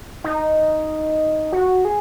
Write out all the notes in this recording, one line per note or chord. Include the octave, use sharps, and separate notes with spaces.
D#4
F#4
G#4